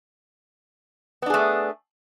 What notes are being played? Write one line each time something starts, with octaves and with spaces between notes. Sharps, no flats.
A3 B3 D4 G#4